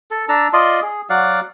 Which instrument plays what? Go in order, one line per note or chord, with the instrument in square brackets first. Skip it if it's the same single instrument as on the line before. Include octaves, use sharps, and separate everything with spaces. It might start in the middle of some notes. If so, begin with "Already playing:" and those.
[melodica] A4
D4 A5 A#5 E6
F4 D5 D#5 C6
G#4
F#3 D5 F5 F#5